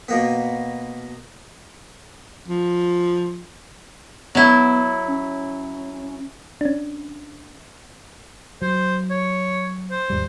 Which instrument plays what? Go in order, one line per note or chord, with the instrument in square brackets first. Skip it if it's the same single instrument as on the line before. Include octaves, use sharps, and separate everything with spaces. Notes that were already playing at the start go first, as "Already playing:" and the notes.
[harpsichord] B2 A#3 B3
[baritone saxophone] F3
[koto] F#3 E4 [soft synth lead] B3
[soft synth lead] C#4
[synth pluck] C#4 D4
[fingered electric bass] F#3 [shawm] C5
[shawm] C#5
C5
[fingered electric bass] D#2 G#2 G3